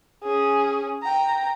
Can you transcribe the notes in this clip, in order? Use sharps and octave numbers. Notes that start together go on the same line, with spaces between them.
C#4 G#4
G5 A#5